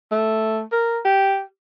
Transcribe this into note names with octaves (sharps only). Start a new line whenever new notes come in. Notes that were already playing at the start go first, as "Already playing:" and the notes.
A3
A#4
G4